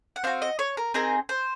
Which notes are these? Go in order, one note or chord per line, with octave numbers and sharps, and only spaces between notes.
F#5
C4 F#4 F5
D#5
C#5
A#4
C4 D#4 G#4 A#4
C5